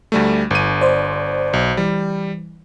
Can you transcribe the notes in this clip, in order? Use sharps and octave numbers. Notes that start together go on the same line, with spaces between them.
D2 G3 A3
G1 D#7
C5 D5
B1
E3 G3